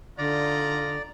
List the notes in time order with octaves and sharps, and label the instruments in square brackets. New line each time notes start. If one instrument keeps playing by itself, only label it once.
[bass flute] D3 [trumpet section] D#4 F4 A#5 [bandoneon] D5